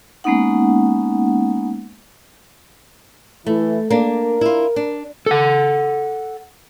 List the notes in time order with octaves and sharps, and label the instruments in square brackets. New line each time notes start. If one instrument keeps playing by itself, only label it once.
[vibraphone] G#3 A#3 B3 C#4 D#4 F#5
[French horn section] E3 E4 [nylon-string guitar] A3
[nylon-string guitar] A#3 D4 [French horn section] A#4
[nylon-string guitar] E4 F4
D4
[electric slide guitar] A4 F#5